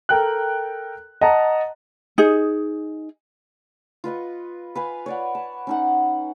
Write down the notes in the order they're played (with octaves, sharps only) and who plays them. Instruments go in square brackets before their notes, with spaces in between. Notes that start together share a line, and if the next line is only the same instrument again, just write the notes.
[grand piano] A4 A#4 G5 F#6
D#5 F#5 A5 A#5
[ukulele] D#4 G#4
[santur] F4 B4 D#5 C#6
B4 F5 G#5
C#5 D5 F#5
A5
C#4 D#4 F#5